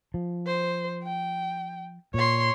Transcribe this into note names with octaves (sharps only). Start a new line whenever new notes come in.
F3
C5
G5
A#2 C#5 C6